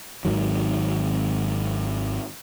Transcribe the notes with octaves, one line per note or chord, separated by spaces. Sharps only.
G#1 G#2 D#3 F#3